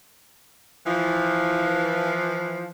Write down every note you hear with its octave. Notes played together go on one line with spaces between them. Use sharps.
E3 F3